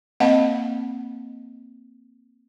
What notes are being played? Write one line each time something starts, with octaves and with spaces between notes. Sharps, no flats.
A#3 C4 D#5 F5 F#5 A5